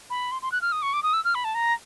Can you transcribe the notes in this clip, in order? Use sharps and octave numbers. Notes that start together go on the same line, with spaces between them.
B5
C6
C6
F#6
F6
D#6
C#6
D6
D#6
E6
F6
B5
A5
A#5